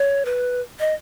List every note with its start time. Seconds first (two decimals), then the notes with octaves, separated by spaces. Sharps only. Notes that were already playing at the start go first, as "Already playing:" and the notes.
Already playing: C#5
0.25 B4
0.80 D#5